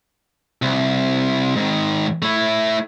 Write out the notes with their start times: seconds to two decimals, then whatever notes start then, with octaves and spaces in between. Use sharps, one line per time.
0.62 C2
1.56 G#2 D#3
2.22 A3 E4